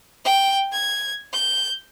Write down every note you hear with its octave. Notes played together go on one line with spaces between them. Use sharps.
G5
G#6
G6